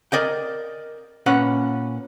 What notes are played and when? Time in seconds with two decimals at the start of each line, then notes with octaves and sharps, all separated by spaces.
0.12 A#4 D5 D#5 G5
1.26 A#2 C#4 B4 F#5